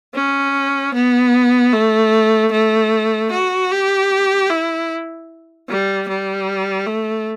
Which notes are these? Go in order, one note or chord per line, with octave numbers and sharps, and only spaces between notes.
C#4
B3
A3
A3
F#4
G4
E4
G3
G3
A3